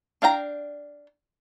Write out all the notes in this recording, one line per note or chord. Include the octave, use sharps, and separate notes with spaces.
D4 F5 G5 A#5